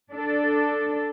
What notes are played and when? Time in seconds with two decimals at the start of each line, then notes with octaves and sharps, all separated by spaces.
0.13 D4 A4